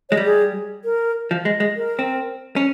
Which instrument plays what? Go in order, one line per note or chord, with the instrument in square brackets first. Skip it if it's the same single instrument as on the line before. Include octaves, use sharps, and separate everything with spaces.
[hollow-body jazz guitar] G#3 [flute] C#5
[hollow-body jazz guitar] G3
[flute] G#4
A#4
[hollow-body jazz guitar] F3
G#3
G#3
[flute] A#4
[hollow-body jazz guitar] C4
C#4